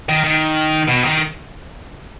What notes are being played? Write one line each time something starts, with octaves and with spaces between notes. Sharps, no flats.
D#3
D#3
B2
D#3